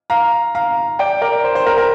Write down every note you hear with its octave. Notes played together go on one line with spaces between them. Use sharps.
F5 A#5
F5 A#5
D5 G5
A#4 D5
C5
C5
A#4
A#4